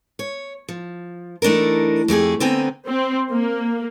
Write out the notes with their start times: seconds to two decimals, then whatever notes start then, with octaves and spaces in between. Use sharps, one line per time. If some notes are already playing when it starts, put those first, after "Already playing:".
0.19 C#5
0.68 F3
1.42 E3 A3 D4 D#4 A#4
2.08 F2 A3 G4 G#4
2.40 D3 B3 C4 G5 G#5 A#5
2.87 C4
3.31 A#3